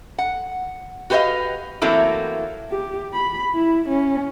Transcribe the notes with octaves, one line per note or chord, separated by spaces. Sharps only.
F#5
F#4 G4 B4 C5 D#5 F5
E3 F#3 A3 A#3 C4 E4
G4
B5
E4
C#4